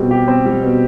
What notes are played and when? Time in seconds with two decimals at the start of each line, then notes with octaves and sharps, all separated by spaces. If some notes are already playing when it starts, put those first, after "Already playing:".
Already playing: B2 G3 C4
0.11 G4
0.28 C4
0.46 G3
0.62 B2